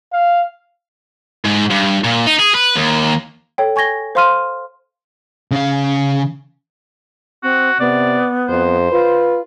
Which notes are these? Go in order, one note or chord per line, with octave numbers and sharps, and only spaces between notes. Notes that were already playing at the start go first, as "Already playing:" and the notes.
F5
G#2
G2
A#2
D#4
G#4
B4
D#2
A4 C#5 G5
G#5 C#6 G#6 A#6 G7
C5 F5 C6 F6 D#7
C#3 F5
C4 F#4
C3 B3 D5
F2 C5
F4 B4